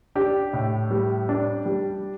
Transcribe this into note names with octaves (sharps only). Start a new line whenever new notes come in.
D4 G4
A2
G3
D4
G3